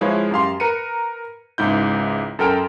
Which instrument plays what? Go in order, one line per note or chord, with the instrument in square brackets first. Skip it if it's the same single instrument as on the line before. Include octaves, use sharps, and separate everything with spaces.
[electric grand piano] F3 G#3 E4 B4 C#5 F5
F#2 G4 F5 C6
A#4 B4 C#7 D#7
C#2 G#2 E4 G6
F#2 A4 A#4 G5 F6 D7